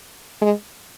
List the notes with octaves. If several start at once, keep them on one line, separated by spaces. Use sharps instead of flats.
G#3